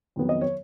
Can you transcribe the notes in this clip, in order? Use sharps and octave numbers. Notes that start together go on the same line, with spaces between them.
F2 D#3 F#3 B3
D#5
C#5